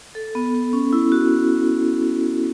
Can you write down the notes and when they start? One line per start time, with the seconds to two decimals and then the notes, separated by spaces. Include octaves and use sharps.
0.15 A4
0.35 B3
0.54 B3
0.73 C#4
0.93 E4
1.12 F#4